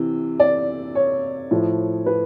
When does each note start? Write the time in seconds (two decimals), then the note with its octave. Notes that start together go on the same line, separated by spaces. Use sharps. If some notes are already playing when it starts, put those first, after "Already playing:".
Already playing: C3 E3
0.40 D5
0.95 C#5
1.51 A2 F3
2.06 B4